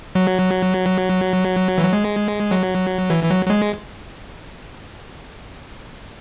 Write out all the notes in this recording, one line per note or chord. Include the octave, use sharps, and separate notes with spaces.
F#3
E3
F#3
G#3
F#3
E3
E3
F#3
F#3
G#3